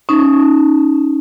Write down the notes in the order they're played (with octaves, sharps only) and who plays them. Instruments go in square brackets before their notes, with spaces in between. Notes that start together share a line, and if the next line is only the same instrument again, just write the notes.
[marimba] C#4 D#4